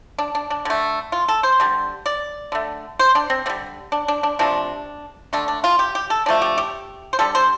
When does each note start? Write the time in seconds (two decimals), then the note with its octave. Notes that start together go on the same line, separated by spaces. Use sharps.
0.18 D4
0.35 D4
0.50 D4
0.65 D3 A3
1.12 F4
1.28 A4
1.43 C5
1.60 D3 G3
2.06 D5
2.52 D3 A3
2.99 C5
3.15 D4
3.30 C4
3.46 D3 C4
3.50 G3
3.92 D4
4.08 D4
4.23 D4
4.39 C3 F3 A3 D4
5.33 D3 A3 D4
5.48 D4
5.64 F4
5.79 G4
5.95 G4
6.10 A4
6.26 D3 F3 A3 D4
6.41 G4
6.58 G4
7.13 C5
7.19 D3 G3 A4
7.35 C5